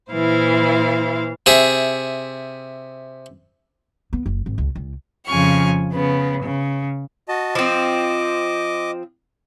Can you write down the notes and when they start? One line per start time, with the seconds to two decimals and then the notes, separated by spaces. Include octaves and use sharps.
0.12 A#2 E3 E4 C5 F5
1.46 C3 G#4 E5
4.13 B3
4.26 F#1
4.46 G#1
4.58 C#2
4.76 C#2
5.26 F2 C#3 F3 G#5 C#6 F6
5.93 C#3 B3
6.42 C#3
7.29 F#4 D#5 A5
7.55 F3 C4 D#5 D6